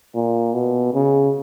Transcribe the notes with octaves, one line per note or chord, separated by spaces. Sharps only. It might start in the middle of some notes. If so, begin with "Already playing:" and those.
A#2
B2
C#3